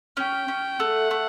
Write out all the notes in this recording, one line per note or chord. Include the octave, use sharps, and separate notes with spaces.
C#4 G5
C#4
A3 F#5
A3